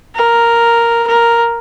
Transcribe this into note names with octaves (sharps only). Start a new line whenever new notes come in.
A#4
A#4